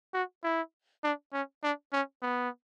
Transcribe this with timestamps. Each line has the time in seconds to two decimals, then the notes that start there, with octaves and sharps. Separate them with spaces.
0.14 F#4
0.44 E4
1.04 D4
1.33 C#4
1.63 D4
1.93 C#4
2.22 B3